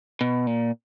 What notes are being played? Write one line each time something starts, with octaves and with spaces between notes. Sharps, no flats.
B2
A#2